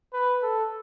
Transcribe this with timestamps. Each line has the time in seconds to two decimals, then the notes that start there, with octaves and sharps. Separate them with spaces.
0.13 B4
0.43 A4